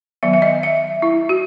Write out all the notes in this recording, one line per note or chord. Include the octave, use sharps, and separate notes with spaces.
D#3 F#3 B3 E5
E5
D#5
E5
E4
F#4